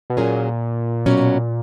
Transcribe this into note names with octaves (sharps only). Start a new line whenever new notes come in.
B2
A#2 F#3 C#4 G#4
B2 F#3 C#4